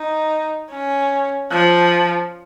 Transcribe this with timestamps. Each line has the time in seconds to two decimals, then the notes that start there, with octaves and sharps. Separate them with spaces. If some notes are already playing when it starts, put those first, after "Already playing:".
Already playing: D#4
0.71 C#4
1.52 F3